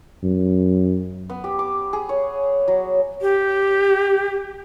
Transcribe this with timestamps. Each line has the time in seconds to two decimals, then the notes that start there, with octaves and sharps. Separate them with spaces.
0.23 F#2
1.30 B3
1.44 G4
1.59 D6
1.93 G#4
2.09 C#5
2.68 F#3
3.22 G4